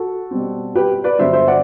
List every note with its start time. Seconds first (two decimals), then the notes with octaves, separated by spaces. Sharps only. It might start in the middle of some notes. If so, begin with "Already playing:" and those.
Already playing: F#4 A4
0.31 B2 G3 C4
0.75 G4 B4
1.04 B4 D5
1.19 G2 D3 F#3 B3 C5 E5
1.33 C5 E5
1.48 D5 F#5